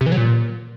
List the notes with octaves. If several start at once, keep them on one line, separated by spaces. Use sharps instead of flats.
C3
E3
F#3
A#2